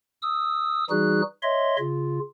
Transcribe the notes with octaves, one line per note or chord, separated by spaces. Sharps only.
D#6 E6
E3 G3 D#4 F#4 G#4 F#6
C#5 D#5 E5 C6
C#3 F4